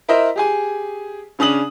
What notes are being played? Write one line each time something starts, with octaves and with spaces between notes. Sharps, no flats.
E4 A#4 C5 D#5 E5
G4 G#4 G#5
C#3 C#4 D4 D#6 F#7